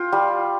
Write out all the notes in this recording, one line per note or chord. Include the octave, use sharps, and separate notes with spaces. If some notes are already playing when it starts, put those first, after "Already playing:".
Already playing: F4 G5
G3